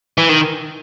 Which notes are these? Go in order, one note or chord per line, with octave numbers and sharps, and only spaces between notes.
E3
D#3